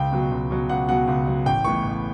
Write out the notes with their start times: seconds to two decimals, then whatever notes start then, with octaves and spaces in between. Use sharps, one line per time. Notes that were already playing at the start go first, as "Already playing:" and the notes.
Already playing: C#2 G5
0.12 B2 F#3
0.31 C#2
0.51 B2 F#3
0.69 C#2 F#5
0.88 B2 F#3 F#5
1.08 C#2
1.27 B2 F#3
1.46 A1 G5
1.64 A2 E3 B3 C#6
1.84 A1